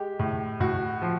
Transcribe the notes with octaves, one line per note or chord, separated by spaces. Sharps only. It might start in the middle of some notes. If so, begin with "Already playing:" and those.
Already playing: G#3 G4
A2
A2 F#4
F3